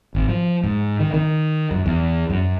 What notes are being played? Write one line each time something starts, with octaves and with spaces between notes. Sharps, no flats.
G#1
F3
G#2
D#3
D#3
F#2
E2
F#2